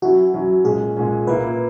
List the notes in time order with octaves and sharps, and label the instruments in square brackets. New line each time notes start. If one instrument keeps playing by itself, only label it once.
[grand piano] F#3 C#4 E4 [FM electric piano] F#4
[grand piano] F#3 C#4 E4
[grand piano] A#2 G#3 C#4 [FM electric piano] G#4
[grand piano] A#2 G#3 C#4
[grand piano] A#2 A#3 E4 [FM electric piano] B4